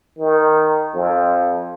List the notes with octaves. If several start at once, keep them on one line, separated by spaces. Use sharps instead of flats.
D#3
F2